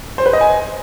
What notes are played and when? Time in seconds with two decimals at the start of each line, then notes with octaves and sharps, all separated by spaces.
0.18 C5
0.26 B4
0.33 D#5
0.41 G#5